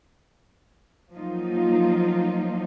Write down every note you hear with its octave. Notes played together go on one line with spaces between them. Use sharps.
F3 F#3 A#3 D#4 F4